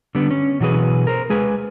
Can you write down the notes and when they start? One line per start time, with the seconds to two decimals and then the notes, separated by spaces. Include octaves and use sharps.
0.15 D3 G3 B3
0.31 C#4
0.60 B2 E3 F#3 F4 G#4 B4
1.07 A#4 C5
1.30 G#3 G#4 B4